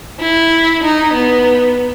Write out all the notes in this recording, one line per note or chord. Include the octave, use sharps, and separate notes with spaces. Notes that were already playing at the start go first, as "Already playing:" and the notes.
E4
D#4
B3